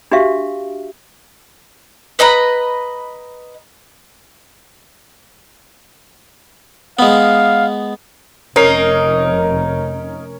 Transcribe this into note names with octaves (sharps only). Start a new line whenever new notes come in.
D4 F#4 G4 E5 F5
B4 D#5 A#5 B5
G#3 B3 F5
F1 C#4 D#4 A#4 C7